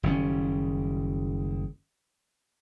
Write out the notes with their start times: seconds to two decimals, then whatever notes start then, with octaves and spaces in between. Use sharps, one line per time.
0.03 F#1 D#3 G3 C#4